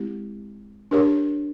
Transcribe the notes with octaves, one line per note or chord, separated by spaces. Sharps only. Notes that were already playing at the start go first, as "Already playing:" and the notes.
Already playing: G#3 C4 E4 G4
D4 G4 A#4 C#5